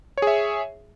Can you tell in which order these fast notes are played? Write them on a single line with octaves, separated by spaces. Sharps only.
C#5 G#4 E5